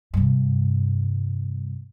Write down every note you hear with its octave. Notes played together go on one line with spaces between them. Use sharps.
G2 C3